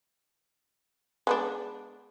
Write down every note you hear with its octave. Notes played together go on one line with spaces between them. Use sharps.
G#3 B3 D4